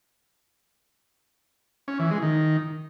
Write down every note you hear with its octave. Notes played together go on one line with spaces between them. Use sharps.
C#4
E3
G#3
D#3